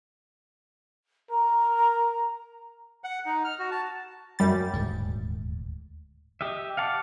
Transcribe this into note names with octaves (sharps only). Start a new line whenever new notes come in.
A#4 A#5
F#5
D#4
F6
F#4
A5
F#2 G3 A6
D#1 D2 G#2
G4 D#5 E5
F5 F#5 A5 D6